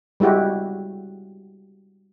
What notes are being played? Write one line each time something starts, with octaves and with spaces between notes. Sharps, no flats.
G3 G#3 E4 F#4 G4